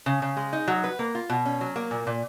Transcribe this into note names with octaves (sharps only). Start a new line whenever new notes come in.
C#3
C#3
G#3
D#4
F#3
B4
A#3
F4
B2
C#4
F#3
A#3
A#2
A#2